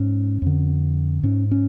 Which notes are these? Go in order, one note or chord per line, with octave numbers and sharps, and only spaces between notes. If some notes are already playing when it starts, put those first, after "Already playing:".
Already playing: G#2 C#4
F2 D3
G#2 C#4
C#4